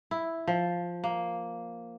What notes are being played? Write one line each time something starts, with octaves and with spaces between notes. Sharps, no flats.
E4
F3
A#3